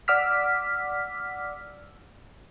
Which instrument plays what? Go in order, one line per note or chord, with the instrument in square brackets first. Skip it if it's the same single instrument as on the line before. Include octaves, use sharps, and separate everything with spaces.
[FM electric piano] D5 F#5 D6 E6 F6 B6